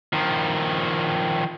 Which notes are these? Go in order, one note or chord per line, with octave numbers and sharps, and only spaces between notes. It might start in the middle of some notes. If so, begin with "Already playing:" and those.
D#3 F3